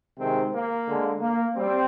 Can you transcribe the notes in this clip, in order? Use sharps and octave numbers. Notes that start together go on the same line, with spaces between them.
C3 D#3 G#3 C4
A#3
D3 G#3
A#3
G3 C4